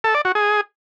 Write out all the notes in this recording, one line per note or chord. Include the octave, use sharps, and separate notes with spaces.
A4
D5
F#4
G#4